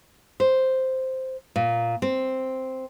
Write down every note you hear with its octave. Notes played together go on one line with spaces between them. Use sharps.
C5
A#2
C4